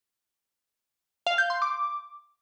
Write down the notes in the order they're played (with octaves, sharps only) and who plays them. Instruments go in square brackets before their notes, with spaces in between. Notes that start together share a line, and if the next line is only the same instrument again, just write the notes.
[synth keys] F5
G6
C6
D6